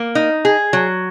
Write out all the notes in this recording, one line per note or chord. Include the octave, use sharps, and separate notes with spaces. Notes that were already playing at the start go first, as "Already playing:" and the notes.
Already playing: A#3
D#4
G#4
F#3